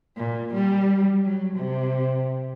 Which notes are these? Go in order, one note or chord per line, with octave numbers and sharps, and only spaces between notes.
A#2
G3
F#3
C3